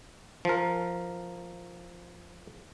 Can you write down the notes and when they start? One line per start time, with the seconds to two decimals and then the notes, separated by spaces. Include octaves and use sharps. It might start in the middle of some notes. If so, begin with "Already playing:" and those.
0.45 F3 A#4